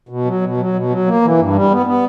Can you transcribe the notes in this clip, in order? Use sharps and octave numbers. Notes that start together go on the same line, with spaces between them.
B2
F#3
B2
F#3
B2
F#3
A#3
E3
G2
G3
B3
B3